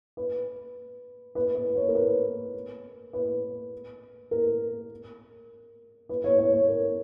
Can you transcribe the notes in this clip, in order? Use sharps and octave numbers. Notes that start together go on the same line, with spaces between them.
B4
B4
B4
C#5
A#4
B4
B4
A#4
B4
C#5
C#5
C#5
A#4